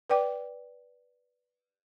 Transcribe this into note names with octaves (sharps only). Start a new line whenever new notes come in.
B4 D5 G5 D6